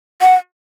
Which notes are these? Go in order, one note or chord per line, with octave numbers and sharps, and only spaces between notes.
F#5